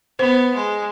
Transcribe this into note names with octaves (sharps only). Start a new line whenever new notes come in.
B3 C5
G#3